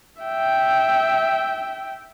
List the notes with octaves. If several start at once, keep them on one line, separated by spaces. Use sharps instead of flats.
E5 G5